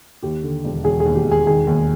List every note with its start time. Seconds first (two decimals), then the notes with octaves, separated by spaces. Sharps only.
0.23 D#2 G4
0.43 D3
0.64 E1
0.84 E1 G#4
1.00 G#4
1.05 D#2
1.15 G4
1.26 E1
1.31 G#4
1.47 D#3 G#4
1.67 D#2